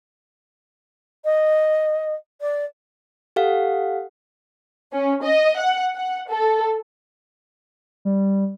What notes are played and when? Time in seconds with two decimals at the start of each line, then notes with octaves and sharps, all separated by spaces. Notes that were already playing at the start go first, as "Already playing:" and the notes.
1.25 D#5
2.41 D5
3.36 G4 A4 F5 F#5
4.92 C#4
5.24 D#5
5.58 F#5
5.95 F#5
6.28 A4
8.05 G3